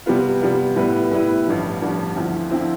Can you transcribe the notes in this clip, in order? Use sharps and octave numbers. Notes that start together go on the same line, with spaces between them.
C3 G3 B3 F4
C3 G3 B3 F4
A2 G3 B3 E4 B4
A2 G3 B3 E4 B4
A1 G2 D3 F3
A1 G2 D3 F3
D2 D3 F3 C4 E4
D3 F3 C4 E4